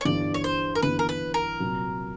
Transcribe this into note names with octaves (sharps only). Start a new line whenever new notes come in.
C#5
G1 G2 E3 D5
C#5
C5
A#4
G1 G2 E3 B4
A#4
B4
A#4
C2 A#2 F#3